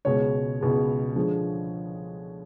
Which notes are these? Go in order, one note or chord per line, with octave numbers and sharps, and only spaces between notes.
C#2 B2 G#3 C#5
C#2 B2 G#3
D3 F3 G#3